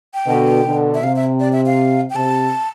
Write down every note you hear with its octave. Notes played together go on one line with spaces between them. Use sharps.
G5
B2 D3
B2 D3
E5
C3 F5
E5
D5
E5
F5
G5
C3 A5